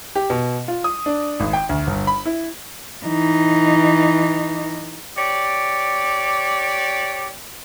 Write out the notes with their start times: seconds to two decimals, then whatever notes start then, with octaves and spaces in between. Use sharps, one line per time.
0.15 G4
0.30 B2
0.68 F4
0.84 D#6
1.06 D4
1.40 G#1
1.53 G5
1.69 D2
1.87 G1
2.07 B5
2.26 E4
3.06 E3 D#4
5.17 G4 C#5 D5